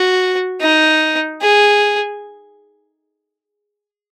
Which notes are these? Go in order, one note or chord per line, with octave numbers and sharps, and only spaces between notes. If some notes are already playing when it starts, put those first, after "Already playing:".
Already playing: F#4
D#4
G#4